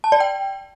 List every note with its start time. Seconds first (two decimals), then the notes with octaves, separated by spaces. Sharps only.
0.04 A5
0.12 D5
0.20 G5